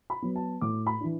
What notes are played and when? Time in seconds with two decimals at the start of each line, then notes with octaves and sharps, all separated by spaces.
0.10 B5
0.22 F#3 B3
0.36 A5
0.61 A2 D6
0.87 B5
1.00 E3 D4